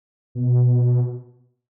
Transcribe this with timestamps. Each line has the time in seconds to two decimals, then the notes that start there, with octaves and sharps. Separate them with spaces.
0.35 B2